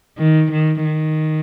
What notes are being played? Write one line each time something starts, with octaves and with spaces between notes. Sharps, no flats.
D#3
D#3
D#3